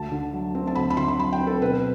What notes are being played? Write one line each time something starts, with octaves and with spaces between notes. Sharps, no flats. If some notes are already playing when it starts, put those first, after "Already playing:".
Already playing: D2 A5
D3
F#3
C4
A5
D2 B5
B5
D3 C6
B5
F#3 B5
G5
C4
A4
B2 B4